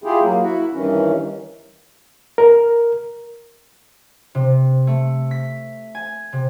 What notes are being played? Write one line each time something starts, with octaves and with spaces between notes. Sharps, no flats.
E4 F4 G4 G#4
F#3 A#3
E4 F#4
G2 D#3 E3 C#4
A#4
C3
A3
B6
G#5
C3